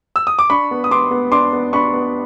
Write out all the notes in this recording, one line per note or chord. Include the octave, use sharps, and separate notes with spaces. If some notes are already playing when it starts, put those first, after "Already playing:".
E6
D#6
D6
D4 B5 C#6
B3
D#6
B3 C6 D6
B3
D4 C6 D6
B3
D4 B5 C#6
B3